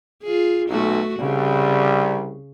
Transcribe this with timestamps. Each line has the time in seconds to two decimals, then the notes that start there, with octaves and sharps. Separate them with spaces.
0.23 F4 G#4
0.69 B1 A3 F#4
1.19 C2 C#3 G3